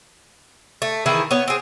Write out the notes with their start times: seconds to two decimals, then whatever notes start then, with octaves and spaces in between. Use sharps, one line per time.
0.82 A3
1.06 D#3 E3 E4 G#4
1.31 B3 C#5
1.48 C4 G#4